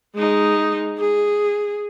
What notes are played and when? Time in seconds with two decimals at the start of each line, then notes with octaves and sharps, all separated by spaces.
0.15 G#3 D#4
0.98 G#4